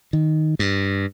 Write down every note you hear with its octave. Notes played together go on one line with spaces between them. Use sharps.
D#3
G2